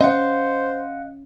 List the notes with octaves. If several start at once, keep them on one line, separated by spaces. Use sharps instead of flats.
C#4 C5 D#5 F5 F#5